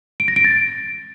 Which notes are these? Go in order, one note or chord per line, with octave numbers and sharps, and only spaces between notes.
D7
A#6
D7
A6